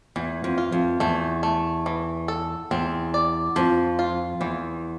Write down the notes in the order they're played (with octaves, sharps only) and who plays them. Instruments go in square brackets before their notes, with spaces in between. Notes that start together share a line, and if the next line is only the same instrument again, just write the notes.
[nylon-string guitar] E2 [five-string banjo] E3
[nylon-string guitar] F2
[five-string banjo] F4
[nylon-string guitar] F2
[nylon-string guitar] E2 [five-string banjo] A3
[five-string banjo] A3
E3
A4
[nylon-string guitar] E2 [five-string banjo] C4
[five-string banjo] D5
[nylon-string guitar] F2 [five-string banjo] F3
[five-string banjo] F4
[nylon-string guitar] E2 [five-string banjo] E3